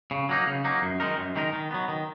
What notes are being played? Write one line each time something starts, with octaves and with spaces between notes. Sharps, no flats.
C#3
F#3 A#3 D#4
C#3
F#3 A#3 D#4
F#2
D#3 G#3 D#4 A#4
F#2
D#3 G#3 D#4 A#4
D#3
F#3 B3
D#3